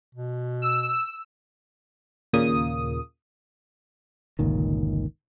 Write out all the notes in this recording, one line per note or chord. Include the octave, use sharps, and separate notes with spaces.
B2
E6
D#2 A#2 C#3 A#3 D#6
G1 C#2 A#2 D#3